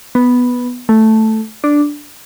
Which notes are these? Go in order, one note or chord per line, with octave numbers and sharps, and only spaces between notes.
B3
A3
D4